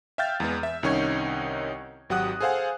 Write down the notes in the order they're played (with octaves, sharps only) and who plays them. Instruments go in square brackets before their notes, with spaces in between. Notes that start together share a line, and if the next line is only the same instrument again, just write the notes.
[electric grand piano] E5 F5 G5 F6 G6 A6
E2 G#3 B3
E5
C2 D#3 C#4 D#4 C#6 G#6
G#1 F#3 G4 F#5 D#6 F#6
G#4 A4 C5 F5 F#5 G#5